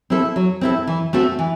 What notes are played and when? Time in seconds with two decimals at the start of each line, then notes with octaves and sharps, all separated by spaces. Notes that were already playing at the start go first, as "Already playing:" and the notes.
0.10 C4 E4 A4
0.36 F#3
0.61 C4 E4 A4
0.87 E3
1.13 A3 C4 F#4 A4
1.39 E3